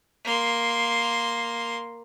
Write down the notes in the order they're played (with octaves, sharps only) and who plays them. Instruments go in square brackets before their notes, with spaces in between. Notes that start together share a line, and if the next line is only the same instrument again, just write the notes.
[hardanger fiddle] A#3 C6